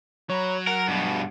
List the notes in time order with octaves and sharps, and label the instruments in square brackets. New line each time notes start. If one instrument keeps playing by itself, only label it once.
[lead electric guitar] F#3 [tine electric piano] C#5 A#5 B5
[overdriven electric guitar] A#4 [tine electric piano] F#5
[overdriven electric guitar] G2 B2